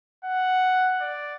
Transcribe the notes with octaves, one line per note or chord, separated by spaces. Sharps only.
F#5
D5